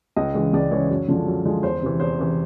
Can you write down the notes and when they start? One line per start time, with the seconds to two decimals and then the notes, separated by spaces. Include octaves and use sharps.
0.16 C#2 D#5
0.34 C#3 E3 G#3
0.53 C#2 D5
0.71 C#3 E3 G#3 C#5
0.90 F#2
1.08 D3 F3 G#3
1.27 F#2
1.45 D3 F3 G#3
1.63 E2 C5
1.82 C3 E3
2.00 E2 C5
2.19 C3 E3